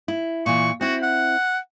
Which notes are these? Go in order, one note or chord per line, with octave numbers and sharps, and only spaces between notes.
E4
A#2 E3 C#6
C4 E4 F#4
F#5